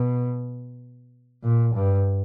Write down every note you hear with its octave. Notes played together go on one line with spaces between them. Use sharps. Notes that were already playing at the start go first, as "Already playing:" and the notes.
Already playing: B2
A#2
G2